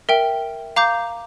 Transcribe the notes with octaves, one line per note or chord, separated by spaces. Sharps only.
A#4 E5 G5
F5 A#5 D6 G6